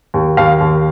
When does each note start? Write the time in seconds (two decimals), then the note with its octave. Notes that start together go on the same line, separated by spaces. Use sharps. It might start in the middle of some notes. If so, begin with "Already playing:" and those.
0.14 D#2
0.37 D#2 F5
0.60 D#2